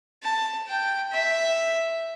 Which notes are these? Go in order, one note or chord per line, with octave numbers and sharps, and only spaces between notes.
A5
G5
E5